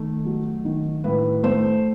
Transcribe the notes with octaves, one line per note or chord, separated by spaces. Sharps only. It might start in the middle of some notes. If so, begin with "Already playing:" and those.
Already playing: D#3 A3
F#3
D#3
A2 B4
A3 C5